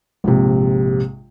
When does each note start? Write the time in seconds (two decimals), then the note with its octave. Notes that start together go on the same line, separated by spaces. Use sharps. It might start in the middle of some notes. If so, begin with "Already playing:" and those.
0.24 A#1 G#2 C3